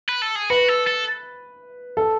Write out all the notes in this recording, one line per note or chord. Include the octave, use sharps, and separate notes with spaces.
B4
A4
G#4
F#4 B4
A4
A4
A4